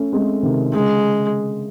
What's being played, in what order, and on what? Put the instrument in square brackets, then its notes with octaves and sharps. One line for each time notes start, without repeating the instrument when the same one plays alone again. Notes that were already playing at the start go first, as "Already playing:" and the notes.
Already playing: [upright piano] A3 C#4
G#3 C4
C3 D#3
[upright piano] C#3 [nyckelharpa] G#3